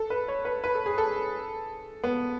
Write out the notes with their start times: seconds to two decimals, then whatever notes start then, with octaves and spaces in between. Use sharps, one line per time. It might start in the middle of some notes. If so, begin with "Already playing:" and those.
Already playing: A4
0.10 B4
0.28 C#5
0.45 B4
0.64 B4
0.75 A4
0.86 G#4
0.98 A4
2.04 B3